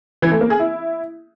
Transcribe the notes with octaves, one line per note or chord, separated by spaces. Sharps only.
E3
A3
A#3
G#4
E4